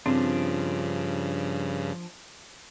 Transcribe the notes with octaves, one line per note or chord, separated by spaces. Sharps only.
G2 C#3 F3 C4 D4